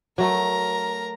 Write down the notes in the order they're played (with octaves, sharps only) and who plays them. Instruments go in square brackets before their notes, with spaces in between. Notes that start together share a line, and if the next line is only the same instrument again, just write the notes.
[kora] F#3 A3 [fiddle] A#4 A#5